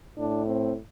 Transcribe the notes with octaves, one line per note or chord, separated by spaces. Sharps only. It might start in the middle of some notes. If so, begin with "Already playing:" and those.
A2 D4
C4